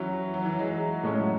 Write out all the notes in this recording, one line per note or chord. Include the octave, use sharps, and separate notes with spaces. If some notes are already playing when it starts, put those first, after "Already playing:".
Already playing: E3 F#3 C#4 E4
F#3
E3
G#3
G#3
A2 G#3 A3 C#4
F#3